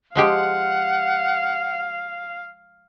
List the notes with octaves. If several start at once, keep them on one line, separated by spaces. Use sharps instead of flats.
F3 G#3 G4 F5 F#5